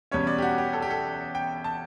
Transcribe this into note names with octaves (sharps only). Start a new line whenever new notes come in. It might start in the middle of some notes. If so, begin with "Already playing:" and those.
E2 B2 G3 C#4 C#5
D5
G4
F#4
G4
A4
G4
A4
G5
A5